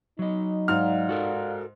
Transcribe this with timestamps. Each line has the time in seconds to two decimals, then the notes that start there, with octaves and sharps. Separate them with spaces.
0.19 F#3 D#4 D#5
0.68 G#2 D5 F5 F#5 F6
1.09 F#4 A4 A#4